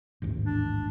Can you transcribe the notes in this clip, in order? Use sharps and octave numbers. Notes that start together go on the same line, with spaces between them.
A1 D#2 G#2
D4